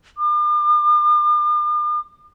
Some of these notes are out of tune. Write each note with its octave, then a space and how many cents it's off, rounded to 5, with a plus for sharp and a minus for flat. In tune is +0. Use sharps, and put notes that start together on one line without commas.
D6 +45